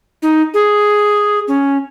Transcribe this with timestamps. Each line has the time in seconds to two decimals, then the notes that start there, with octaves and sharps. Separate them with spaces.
0.22 D#4
0.54 G#4
1.48 C#4